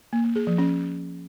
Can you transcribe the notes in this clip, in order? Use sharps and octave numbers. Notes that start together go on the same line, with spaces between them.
A#3
A#3
G#4
F3
C#4